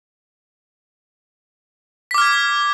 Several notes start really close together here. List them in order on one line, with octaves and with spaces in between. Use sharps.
B6 D6 F6 G#6